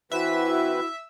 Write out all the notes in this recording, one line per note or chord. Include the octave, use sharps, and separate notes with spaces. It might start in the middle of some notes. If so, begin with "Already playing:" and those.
E3 C4 E4 F#4 B4 E5